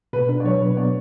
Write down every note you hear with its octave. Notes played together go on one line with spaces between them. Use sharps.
B2 B4
D4 B4
D5
F#3 C#5
B2 B4
B3 D5